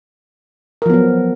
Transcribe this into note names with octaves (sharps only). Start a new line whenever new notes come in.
F3 F#3 B3 A#4